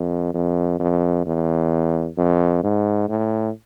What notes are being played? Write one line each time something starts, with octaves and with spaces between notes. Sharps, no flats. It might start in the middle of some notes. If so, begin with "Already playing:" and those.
Already playing: F2
F2
F2
E2
F2
G#2
A2